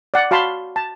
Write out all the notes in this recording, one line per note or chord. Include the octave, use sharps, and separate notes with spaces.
D5 F#5
F#4 F5 A5 B5 C6
A5